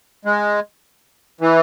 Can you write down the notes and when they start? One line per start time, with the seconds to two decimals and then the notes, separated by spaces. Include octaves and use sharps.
0.25 G#3
1.41 E3